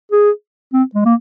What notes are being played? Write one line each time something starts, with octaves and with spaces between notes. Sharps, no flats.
G#4
C4
G#3
A#3